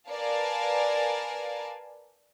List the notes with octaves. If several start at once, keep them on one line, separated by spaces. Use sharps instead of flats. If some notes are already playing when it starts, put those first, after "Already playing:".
A#4 B4 D5 F5 G#5 A5